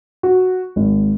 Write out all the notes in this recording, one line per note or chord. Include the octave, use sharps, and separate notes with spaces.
F#4
G#1